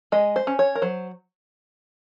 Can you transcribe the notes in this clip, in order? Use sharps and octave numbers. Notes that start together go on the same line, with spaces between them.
G#3 D#5
C5
C#4
C#5
A#4
F#3 C5